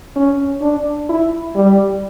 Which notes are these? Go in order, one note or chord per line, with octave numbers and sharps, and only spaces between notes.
C#4
D4
E4
G3